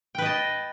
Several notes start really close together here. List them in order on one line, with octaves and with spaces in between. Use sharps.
G5 B4 D#5 A5